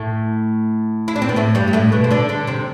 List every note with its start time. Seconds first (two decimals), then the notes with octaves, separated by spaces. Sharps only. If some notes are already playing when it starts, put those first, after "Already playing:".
Already playing: A2 A3
1.08 E4
1.16 D4
1.22 C4
1.29 B3
1.36 A2 A3
1.55 G2 G3
1.68 G3
1.73 A2 A3
1.92 B2 B3
2.04 C4
2.11 D3 D4
2.29 D3 D4
2.47 C3 C4